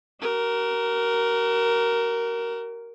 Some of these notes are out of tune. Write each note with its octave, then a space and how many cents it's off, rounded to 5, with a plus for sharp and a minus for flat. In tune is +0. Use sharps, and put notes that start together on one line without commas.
F#4 +40 A#4 +0